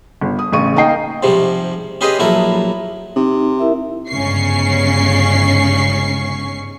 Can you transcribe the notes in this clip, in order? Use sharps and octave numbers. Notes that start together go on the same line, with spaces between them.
G1
D#6
A1 C#3 C#6 D#7
A#3 D#4 A#4 D#5 G5 C7
G#2 C3 F3 G3
C#4 G4 G#4 B4 C5 D#5
A#1 F#3 E4 A4 A#4
C3 D#4
E4 A#4 E5
G1 G#2 C#3 C#4 C#6 C7